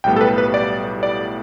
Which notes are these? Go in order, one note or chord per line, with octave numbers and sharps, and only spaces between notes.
B1 A2 G3 B3 G5
A4
B4
B4
D5
D5